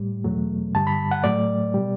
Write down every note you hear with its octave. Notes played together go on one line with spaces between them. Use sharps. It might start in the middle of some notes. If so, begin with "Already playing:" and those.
Already playing: A2 G3
E2 B2 F#3 A3
G2 D3 G3 A5
B5
F#5
A2 F#3 A3 D5
B2 G3